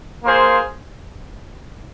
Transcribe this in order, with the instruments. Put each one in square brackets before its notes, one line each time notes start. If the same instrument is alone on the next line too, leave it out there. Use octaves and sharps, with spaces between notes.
[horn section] A#3 F4 G#4 C5